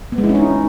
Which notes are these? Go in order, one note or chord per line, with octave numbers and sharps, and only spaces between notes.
B3
G#3
E4
C#4
D#4